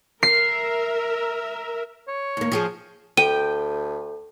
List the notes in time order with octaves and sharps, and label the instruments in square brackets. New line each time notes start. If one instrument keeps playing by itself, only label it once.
[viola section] A#4 E5 [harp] C7
[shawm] C#5
[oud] D#2 A#3
F3 G4 G#4
[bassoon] D2 [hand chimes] A4 [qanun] G5 [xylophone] D#7